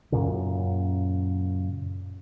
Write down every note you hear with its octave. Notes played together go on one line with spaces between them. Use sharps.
F#2 A#2 C#3